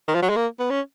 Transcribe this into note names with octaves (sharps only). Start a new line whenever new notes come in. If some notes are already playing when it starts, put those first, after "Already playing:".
D#3
F3
F#3
G#3
A#3
B3
C#4